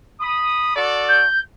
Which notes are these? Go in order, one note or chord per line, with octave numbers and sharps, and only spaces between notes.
B5 D#6
F#4 A4 D5
G6